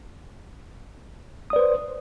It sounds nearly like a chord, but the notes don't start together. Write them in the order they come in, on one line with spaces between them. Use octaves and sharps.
D#6 D5 B4 C5